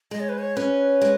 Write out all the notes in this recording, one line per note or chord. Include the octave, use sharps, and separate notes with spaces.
G#3 D#5
C#5
B4
C#5
C#4 B4
G#3